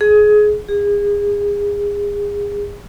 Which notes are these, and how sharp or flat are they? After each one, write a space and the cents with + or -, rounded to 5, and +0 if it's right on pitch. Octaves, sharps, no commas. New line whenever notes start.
G#4 +20
G#4 -30